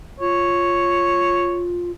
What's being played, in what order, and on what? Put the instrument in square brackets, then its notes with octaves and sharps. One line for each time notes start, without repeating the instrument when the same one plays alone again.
[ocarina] F4 [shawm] C#5